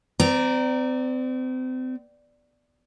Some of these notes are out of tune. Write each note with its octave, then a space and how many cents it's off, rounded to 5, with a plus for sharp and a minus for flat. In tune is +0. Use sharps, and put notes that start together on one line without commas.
C4 -35 D5 +0 A#5 -5